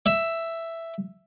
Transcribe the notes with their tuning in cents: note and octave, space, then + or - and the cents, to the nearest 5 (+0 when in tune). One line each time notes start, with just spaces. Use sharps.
E5 +5